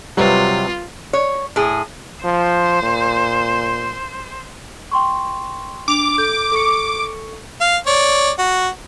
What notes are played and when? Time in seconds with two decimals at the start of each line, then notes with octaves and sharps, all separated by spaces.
0.17 C3 F#3 G3 C4 F4 B4
1.13 C#5
1.56 A2 G#4
2.25 F3 C5
2.82 A#2
4.91 G5 C6 C#6
5.88 D4 D6 F7
6.18 A4 G6
6.52 A4 C#6 C#7
7.61 F5
7.87 C#5 D5
8.39 F#4